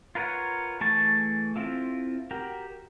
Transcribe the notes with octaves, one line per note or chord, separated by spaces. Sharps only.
F4 A#4 B4 C#5 F#5
E3 A3 G#4 A5 C#6
C4 E4 F4 A4
F#4 G4 A#4